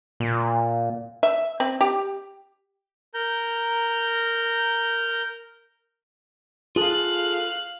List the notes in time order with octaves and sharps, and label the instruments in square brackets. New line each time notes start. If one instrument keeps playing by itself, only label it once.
[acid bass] A#2
[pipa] E5
C4
G4
[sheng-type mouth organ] A#4 A#5 G6
[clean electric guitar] F4 G#4 A4 [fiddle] F5 F#6